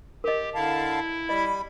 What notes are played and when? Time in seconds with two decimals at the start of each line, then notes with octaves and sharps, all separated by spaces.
0.24 G4 A#4 D#5
0.55 D3 E4 F5 A5
1.29 G3 D#5 B5